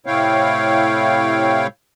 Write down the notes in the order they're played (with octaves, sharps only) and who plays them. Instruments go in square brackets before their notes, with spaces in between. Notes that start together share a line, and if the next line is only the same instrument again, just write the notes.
[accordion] A2 C3 E4 C#5 F5 G5